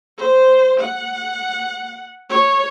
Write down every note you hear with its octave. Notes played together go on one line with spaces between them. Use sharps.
C5
F#5
C#5